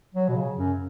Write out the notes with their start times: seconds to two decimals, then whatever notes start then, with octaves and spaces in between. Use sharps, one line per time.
0.15 F#3
0.28 B2
0.36 C#3
0.57 F#2